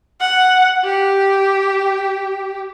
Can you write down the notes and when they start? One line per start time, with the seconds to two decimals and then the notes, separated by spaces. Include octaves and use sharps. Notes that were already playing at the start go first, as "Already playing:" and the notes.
0.20 F#5
0.84 G4